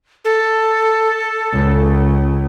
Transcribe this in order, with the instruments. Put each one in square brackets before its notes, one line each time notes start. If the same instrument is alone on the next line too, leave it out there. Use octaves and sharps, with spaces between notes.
[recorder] A4
[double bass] C#2